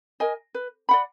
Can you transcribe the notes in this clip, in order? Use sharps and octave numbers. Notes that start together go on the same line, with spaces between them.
A#4 D#5 G#5
B4
D5 F#5 B5